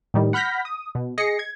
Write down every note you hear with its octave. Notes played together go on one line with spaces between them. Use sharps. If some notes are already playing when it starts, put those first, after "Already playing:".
A2 D#3 G3
F#5 B5 F6 G6 A#6 B6
D#6
B2
G#4 D#5 A#6 C7 C#7
G#6